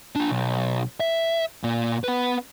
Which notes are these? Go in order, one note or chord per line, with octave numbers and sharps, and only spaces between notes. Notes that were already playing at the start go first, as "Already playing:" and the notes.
D4 F4
B1
E5
A#2 A#3
B3 B4